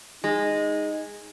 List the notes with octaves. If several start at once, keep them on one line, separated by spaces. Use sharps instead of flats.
G#3 D#4